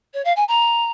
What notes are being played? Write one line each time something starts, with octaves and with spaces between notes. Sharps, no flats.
C#5
F5
G#5
A#5